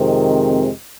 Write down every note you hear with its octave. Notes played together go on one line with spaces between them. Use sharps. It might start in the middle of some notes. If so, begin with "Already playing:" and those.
Already playing: F2 C3 D#3 G#3 C4